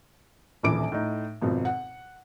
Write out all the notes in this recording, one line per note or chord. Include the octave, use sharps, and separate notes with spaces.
D#1 A#1 E3 D6 D7
A2 D#4
G#1 F2 B2
F#5